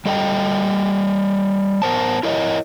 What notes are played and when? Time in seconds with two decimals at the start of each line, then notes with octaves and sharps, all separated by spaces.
0.06 G3 A4 D#5 G5
1.82 B3 A#4 C5 A5
2.23 E4 A#4 C#5 D#5